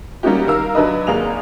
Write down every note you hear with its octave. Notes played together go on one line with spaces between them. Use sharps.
G3 A#3 C#4 D#4 F#4 G4
D#3 A#4 F5 E6
F#3 D4 B4 D#5
G#1 A#3 G#4 F7